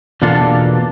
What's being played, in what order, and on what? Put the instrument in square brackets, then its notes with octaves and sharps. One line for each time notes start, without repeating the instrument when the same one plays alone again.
[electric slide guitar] E2 B2 A#3 D4 F4 A4